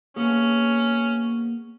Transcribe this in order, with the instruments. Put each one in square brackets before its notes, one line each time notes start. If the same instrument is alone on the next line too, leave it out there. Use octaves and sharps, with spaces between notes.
[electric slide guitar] A#3 B3 G#4 [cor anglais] C#4